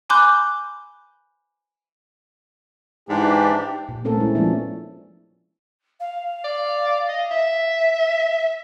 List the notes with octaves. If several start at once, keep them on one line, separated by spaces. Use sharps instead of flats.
G#5 B5 C6 D6 F#6 G6
G#2 E3 D4 G4
A#2
A3 C4 C#4 A4 A#4
G#3 E4
F3 G#3 B3 C#4 D4 E4
F5
D5
D#5
E5